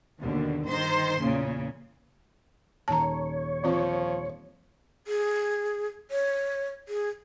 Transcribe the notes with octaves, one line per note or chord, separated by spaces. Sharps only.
D#2 B2 D3
G1 D#3 C5 C6
E2 A#2 C#3
D#1 D#3 C#5 A5 A#5
E3 F3 C4 F4
G#4
C#5
G#4